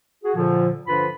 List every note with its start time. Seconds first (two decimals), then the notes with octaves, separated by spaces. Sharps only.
0.24 F#4 G#4
0.36 A#2 D3 F3
0.87 G2 D3 F3 F4 B4 B5